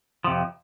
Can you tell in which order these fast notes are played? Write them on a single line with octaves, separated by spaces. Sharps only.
F3 C3 F2